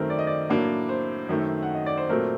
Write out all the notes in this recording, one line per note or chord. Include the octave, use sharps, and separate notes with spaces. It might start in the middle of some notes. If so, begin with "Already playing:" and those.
Already playing: F#2 D#3 A3 C4 A#4
D5
D#5
D5
A2 F#3 A#3 D4
C5
F#2 D#3 A3
F#5
D#5
D5
C5
A#2 F#3 A3 C4 A#4